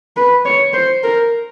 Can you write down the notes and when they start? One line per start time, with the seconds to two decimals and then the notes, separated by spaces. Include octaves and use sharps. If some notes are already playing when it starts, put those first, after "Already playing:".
0.17 B4
0.45 C#5
0.73 C5
1.03 A#4